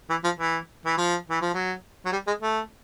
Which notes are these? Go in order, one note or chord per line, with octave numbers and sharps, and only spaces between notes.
E3
F3
E3
E3
F3
E3
F3
F#3
F#3
G3
G#3
A3